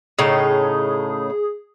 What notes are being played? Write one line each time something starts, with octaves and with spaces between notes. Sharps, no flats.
A2 C#3 D#4 G#4